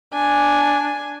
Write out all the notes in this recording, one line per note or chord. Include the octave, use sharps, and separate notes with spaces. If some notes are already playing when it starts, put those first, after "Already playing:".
D4 G#5